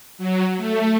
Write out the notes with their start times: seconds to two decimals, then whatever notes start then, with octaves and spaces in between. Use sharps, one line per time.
0.18 F#3
0.57 A3